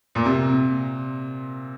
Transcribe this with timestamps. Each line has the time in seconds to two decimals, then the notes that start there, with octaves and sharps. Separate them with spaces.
0.15 A#2
0.25 C3